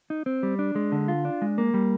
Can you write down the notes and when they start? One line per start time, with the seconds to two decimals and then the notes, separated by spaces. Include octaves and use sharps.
0.10 D#4
0.26 C4
0.43 G3
0.59 D4
0.75 G#3
0.92 D3
1.08 F4
1.25 D4
1.42 G#3
1.58 A#3
1.74 G3